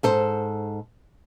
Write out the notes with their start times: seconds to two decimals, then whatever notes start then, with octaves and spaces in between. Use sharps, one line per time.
0.03 G#2 A4 C5